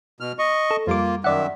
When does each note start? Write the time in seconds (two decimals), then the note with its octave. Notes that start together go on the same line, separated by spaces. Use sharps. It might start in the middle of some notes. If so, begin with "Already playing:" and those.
0.20 B2 F6
0.39 D#5 C#6
0.71 A4
0.87 F2 G3 A#3 F4 D6
1.24 F#2 D#3 D5 E5 F#5